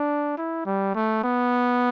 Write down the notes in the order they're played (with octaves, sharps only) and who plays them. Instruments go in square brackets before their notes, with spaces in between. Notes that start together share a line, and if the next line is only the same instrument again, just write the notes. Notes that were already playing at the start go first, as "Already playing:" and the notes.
Already playing: [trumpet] D4
E4
G3
A3
B3